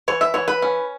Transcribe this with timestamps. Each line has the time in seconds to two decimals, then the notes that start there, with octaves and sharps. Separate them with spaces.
0.08 E3 C#5
0.21 E5
0.34 E3 C#5
0.48 B4
0.62 C#4